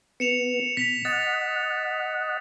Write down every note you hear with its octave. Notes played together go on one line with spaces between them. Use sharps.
B3 C#7 E7 F7
B2 B6 F7
D#5 F#5 A6